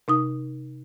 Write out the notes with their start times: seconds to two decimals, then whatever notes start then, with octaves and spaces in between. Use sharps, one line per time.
0.08 C3 D#4 D#6